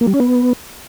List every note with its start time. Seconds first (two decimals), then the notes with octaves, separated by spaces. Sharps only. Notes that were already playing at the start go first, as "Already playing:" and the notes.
0.01 A#3
0.07 G3
0.14 C#4
0.20 B3